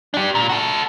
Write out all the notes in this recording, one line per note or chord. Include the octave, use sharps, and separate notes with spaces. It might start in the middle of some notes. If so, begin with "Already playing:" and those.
D4 G4
A#2
F#4 A4